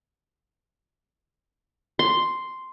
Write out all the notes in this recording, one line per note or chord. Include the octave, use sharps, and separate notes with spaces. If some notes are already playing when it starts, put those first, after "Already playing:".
C6